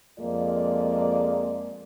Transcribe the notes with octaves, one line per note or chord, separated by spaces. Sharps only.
F2 G#3 A#3 F4 D5